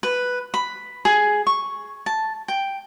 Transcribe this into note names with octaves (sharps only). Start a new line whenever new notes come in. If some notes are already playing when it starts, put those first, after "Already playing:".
B4
B5
G#4
C#6
A5
G5